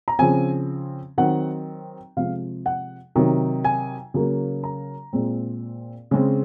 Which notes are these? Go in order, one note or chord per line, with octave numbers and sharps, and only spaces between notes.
A#5
C#3 F3 C4 G#5
D#3 F#3 C4 F#5
C3 F3 G#3 F5
F#5
C3 D#3 F#3
G#5
C#3 F#3 A#3
A#5
A#2 G#3 C4
C#3 G#3 C4